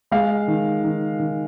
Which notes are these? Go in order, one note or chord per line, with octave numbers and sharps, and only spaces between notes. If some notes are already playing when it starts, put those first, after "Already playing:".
G#3 F5
D#3
D#3
D#3